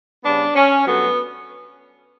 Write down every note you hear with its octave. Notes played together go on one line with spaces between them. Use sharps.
C#3 G3 B3 D4
C#4
G2 F#3 A3 B3